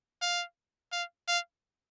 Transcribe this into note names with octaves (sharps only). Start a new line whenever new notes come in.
F5
F5
F5